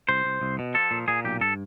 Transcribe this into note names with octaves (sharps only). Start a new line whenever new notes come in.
C2 C5
C2
C2
B2
F3 A4
A#2
A#2 G#4
B1 G4
G2 A4